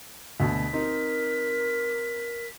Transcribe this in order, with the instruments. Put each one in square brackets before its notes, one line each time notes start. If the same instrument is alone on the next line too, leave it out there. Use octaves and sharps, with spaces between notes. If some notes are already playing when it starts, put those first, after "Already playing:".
[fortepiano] D2 B2 [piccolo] B6
[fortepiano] C4 D#4 [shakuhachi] A#4